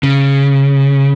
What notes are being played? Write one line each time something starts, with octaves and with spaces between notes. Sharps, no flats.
C#3